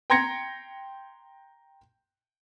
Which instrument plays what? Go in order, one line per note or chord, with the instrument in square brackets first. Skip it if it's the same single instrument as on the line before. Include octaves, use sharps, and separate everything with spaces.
[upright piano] G5 A#5 C6 G#6 A#6 C#7